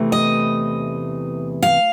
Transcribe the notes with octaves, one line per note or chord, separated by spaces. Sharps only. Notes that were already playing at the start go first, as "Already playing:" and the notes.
Already playing: E2 C3 E3 A3
D#5
F5